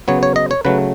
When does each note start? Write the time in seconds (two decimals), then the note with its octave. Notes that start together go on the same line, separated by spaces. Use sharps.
0.08 C#3 F#3 B3 C#5
0.23 C#5
0.36 D#5
0.51 C#5
0.65 C#3 F#3 A3 B4